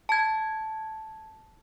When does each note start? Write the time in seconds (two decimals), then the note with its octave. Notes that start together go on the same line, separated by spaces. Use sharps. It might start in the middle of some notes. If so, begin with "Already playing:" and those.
0.09 A5 G#6